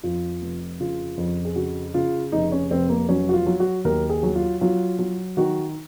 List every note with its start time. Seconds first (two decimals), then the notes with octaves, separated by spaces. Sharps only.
0.03 F2 F4
0.41 F1
0.80 C#3 F4
1.17 F2
1.45 G#4
1.56 C#3 F#4
1.94 C#3 F4
2.32 F1 D#4
2.52 C#4
2.70 F1 C4
2.89 A#3
3.09 F#3 C#4
3.29 F#4
3.34 F4
3.46 F#3
3.60 F#4
3.85 D#2 A#4
4.10 G#4
4.23 F#3
4.36 F4
4.61 F#3 F4
4.99 F#3
5.37 D#3 F#4